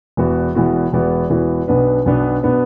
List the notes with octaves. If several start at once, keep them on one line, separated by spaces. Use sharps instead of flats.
E1 E2 E3 B3 F#4
E1 E2 E3 B3 F#4
E1 E2 E3 B3 F#4
E1 E2 E3 B3 F#4
B1 B2 B3 D4 B4
B1 B2 B3 D4 B4
B2 B3 D4 B4